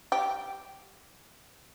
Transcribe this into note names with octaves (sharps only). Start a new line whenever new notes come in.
G4